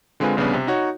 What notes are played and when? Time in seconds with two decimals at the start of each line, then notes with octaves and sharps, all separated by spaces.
0.20 D3 G#3 C4 F4 B4 G#5
0.37 A#1 C#3 G3 B3 D4
0.53 C3
0.67 D#4 F#4 C#5